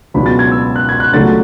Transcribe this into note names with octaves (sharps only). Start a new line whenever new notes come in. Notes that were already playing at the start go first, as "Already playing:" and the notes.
C#2 B2 F#3 B3 D4 B5
A6
G#6
E6
F#6
G#6
F#6
C#2 C#3 F#3 A3 D4 A6